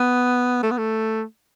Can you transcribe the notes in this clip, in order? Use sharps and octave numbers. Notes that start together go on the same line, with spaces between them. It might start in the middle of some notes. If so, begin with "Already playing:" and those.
Already playing: B3
A3
B3
A3